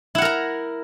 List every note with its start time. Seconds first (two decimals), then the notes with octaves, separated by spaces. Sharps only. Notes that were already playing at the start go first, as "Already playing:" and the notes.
0.15 E4
0.18 F#5
0.22 A#4
0.25 A#5